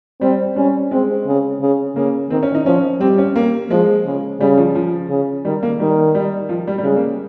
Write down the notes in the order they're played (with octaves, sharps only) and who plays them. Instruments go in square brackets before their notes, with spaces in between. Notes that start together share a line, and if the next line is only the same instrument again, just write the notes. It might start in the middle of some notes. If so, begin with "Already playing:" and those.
[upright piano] G3 [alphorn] C4
[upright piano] G3 [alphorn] C#4
[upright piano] G#3 [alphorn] C4
[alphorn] C#3
C#3
[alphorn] C#3 [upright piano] A#3
[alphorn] D#3 [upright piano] C4
[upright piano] C#4
D#4
[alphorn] F3 [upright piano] C#4
[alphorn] G3 [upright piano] C4
[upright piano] C#4
A#3
[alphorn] F3 [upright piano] G#3
[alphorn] C#3
[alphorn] C#3 [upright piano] G3
[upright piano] F3
F3
[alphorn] C#3
[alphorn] D#3 [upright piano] G3
[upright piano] A#3
[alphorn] D#3 [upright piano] G3
[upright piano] G3
F3
G3
G3
[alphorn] C#3 [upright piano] G#3
[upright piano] A#3